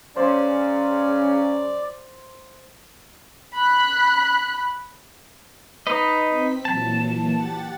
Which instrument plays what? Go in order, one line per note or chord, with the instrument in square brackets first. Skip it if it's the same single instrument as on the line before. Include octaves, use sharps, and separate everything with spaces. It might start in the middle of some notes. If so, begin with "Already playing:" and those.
[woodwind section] C#3 F#3 C#4 [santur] C5 [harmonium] D5
[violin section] B5 F#6
[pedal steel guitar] D#4 B4 D#5
[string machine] C4 B6
[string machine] A#2 E3 F#3 [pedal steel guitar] A5
[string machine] G4 F#5 A6